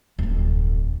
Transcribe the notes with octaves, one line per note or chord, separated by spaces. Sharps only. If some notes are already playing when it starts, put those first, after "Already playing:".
D1 F2